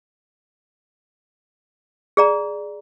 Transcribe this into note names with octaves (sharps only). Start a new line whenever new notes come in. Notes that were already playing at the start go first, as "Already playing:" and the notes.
G#4 D5 A#5